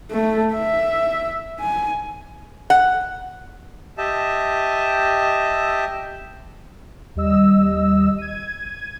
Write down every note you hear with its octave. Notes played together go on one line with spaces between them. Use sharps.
A3
E5
G#5
F#5
G4 D#5 E5 A5
D#2 G3 D#5 E6
G#6 D#7